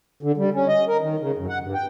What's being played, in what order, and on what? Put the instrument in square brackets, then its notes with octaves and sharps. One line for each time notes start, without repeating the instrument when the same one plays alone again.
[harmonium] D3
G3
C#4
D#5
A#4
D#3
C#3
F#2
F#5
G2
G5